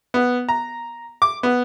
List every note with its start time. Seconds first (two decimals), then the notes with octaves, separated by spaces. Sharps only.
0.14 B3
0.49 A#5
1.22 D6
1.43 B3